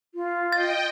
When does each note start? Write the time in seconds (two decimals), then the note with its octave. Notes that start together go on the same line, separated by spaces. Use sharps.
0.14 F4
0.52 D#5 G5 A6